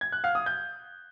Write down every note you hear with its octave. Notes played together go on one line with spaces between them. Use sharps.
G#6
F#6
F5
D#6
G6